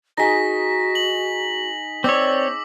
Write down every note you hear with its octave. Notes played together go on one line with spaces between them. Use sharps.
D#4 F#4 G#4 A#6 B6
F#7
C4 C#5 D5 D6 E6